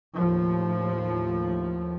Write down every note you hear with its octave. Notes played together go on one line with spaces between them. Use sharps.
D#2 A2 F3